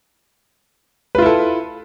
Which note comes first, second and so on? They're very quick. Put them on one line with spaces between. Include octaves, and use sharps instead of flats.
B4 F4 E4 A4